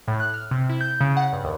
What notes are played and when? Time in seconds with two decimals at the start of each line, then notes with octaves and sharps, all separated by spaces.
0.08 A2
0.20 F#6
0.34 F6
0.51 C3
0.69 E4
0.81 G6
1.01 C#3
1.17 F#5
1.33 G2
1.44 D#2